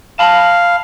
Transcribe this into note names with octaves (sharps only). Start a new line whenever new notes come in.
F5 A5 B5